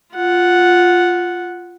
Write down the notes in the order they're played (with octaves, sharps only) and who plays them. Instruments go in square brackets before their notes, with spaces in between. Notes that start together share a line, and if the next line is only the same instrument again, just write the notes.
[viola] F4 F#5